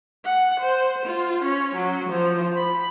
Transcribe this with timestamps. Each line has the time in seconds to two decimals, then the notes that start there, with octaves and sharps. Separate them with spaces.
0.25 F#5
0.60 C5
1.06 F4
1.44 C#4
1.76 F#3
2.10 F3
2.57 B5